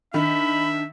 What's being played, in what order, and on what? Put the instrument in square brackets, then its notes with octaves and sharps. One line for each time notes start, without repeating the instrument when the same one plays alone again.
[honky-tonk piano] D#3 [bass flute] D4 [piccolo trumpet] E5 [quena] B5